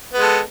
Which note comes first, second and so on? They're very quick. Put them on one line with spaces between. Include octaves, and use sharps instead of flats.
B3 G#3 A4